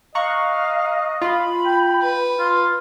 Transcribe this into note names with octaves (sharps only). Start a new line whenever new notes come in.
D#5 F5 A#5 C#6 F#6
F4 B5
G5
B4
F4 C6